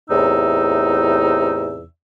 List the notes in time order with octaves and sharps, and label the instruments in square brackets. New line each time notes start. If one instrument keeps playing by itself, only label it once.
[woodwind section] E2 A2 C3 D#4 E6